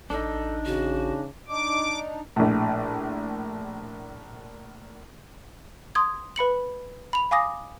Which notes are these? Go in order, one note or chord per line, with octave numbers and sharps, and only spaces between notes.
A1 D4 D#4 A4
C#3 F#4
D4 D#4 D6
A#1 A2
C6 D#6 G#6
B4 B5 C#7 F#7
B5 F7
F5 G#5 D6 D#6 A#6